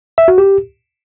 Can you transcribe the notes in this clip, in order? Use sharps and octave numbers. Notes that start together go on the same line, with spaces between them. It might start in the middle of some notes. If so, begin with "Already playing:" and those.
E5
F#4
G4